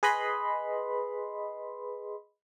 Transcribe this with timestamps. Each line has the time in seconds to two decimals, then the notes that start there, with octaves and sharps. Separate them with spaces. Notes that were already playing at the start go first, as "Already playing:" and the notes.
0.03 G#4 B4 D#5 B5 C6